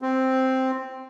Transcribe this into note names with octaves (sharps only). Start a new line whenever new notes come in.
C4